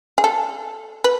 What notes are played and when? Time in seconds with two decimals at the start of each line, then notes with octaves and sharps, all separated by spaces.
0.18 G#4
0.24 A4
1.04 B4